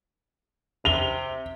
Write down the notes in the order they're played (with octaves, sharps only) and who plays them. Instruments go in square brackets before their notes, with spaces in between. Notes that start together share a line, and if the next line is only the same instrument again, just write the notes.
[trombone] C3 [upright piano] F7 G7